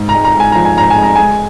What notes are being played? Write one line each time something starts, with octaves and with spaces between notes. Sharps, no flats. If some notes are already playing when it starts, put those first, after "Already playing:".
Already playing: G#2
A#5
G#3
A#5
G#2 G#5
F3 A#5
G#5
G#2 A#5
G#5
G#3
A#5
G#3 G#5